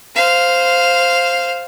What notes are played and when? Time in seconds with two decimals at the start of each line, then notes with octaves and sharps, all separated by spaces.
0.15 C5 F5